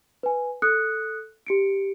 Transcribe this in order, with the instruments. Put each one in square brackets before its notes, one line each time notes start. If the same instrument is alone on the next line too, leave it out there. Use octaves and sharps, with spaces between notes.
[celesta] B4 G#5
A4 D#6 F#6 C#7
G4 C#7 D7